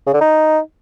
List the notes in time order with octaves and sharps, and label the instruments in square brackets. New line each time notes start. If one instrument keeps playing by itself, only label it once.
[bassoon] C#3
D3
D#4